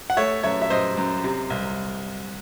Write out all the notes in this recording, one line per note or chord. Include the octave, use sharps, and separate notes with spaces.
F#5
A3 C#5 E5
F#2 C#5 E5
E5
F#2 C5 D#5
F#2
C3
C2